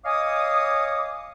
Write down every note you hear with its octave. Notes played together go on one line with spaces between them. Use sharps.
C#5 D#5 F5 G#5 D6 D#6